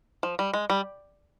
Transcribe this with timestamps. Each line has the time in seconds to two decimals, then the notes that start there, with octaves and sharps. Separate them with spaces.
0.23 F3
0.39 G3
0.54 G#3
0.70 G3